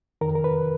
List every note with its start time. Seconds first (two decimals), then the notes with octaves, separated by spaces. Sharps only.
0.21 F2 D#3 A#4
0.35 A#4
0.44 B4